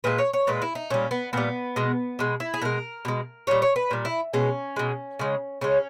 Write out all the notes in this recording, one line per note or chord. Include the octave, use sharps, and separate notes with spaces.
A#2 G#3 B4
C#5
C#5
A#2 G#3 B4
E4
D#4
A#2 G3 C#4
B3
A#2 G3 B3
B2 G#3
B2 G#3
E4
G#4
B2 G#3 A#4
B2 G#3
A#2 G3 C#5
C#5
B4
A#2 G3
E4
B2 G#3 C#4
B2 G#3
C#3 G#3
C#3 G#3 C#4